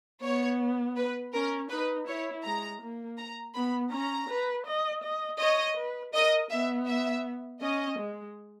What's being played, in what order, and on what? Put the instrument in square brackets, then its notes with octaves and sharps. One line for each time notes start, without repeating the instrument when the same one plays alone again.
[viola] B3 [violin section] C#5
[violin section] B4
[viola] C#4 [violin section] A#4
[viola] D#4 [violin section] B4
[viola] E4 [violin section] C#5
[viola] G#3 [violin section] A#5
[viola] A#3
[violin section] A#5
[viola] B3 [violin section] B5
[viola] C#4 [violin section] A#5
[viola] B4
D#5
D#5
[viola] C#5 [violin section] D#5
[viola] B4
[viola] A#4 [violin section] D#5
[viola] B3 [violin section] E5
[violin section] E5
[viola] C#4 [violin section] D#5
[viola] G#3